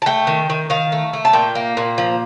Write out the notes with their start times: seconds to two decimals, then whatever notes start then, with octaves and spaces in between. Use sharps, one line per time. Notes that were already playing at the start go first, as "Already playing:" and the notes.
0.02 A5
0.06 A3 G5
0.27 D#3
0.50 D#3
0.70 D#3 F5
0.92 A3
1.13 A3
1.25 A5
1.33 A#2 G5
1.55 A#3
1.77 A#2
1.98 F3